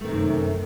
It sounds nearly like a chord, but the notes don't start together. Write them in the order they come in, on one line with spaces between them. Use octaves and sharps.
A3 D#3 C3 F#2